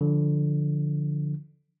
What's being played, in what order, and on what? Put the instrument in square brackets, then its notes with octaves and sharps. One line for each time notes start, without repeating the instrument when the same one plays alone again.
[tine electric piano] D3 F3